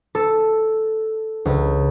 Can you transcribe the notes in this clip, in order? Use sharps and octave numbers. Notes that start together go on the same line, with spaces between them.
A4
C#2